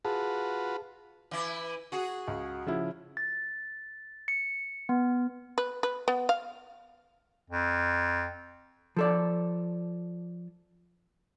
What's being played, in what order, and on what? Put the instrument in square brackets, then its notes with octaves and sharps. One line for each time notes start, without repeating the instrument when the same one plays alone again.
[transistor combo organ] F4 F#4 B4 [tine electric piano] G#4 A5
[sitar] E3 E4
F#4 G#4
[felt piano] C#2
C#3 F3 E4
[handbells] A6
C#7
B3
[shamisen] B4
B4
B3
F5
[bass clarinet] F2
[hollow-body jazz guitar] F3 A4 D5